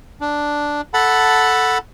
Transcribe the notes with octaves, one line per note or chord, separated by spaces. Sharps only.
D4
A4 F#5 A5 B5